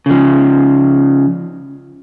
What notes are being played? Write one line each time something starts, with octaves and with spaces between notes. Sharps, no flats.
C#3 F3